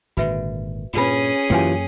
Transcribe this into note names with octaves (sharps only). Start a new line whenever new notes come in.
G#1 A#2 D3 F#4 B4 E5
G2 A#2 C#4 F4 G#4 B4 B5
F#2 E3 A#3 F4 G4 G5 G#5